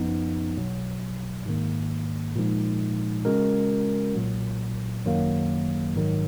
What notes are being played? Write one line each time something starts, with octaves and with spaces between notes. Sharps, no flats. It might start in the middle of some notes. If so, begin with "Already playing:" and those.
Already playing: G#1 F#2 F3 B3 D#4
B1 B2 F#3
G#2 D#3 A#3
A#2 F3 G#3 D#4
C#3 G#3 C#4 F#4 A#4
B1 A#2 F#3
G#1 F#2 D#3 F#3 A#3
A#1 G#2 D#3 F#3